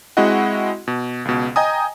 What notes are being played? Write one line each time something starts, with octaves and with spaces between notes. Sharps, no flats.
G#3 C4 E4 F#4 D#5 F#5
B2
C#2 B2
D#5 G5 G#5 A#5 D#6